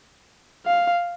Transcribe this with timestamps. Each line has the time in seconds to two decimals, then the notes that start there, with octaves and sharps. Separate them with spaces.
0.66 F5